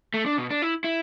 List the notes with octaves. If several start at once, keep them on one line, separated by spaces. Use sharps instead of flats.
A3
D4
B2
D4
E4
E4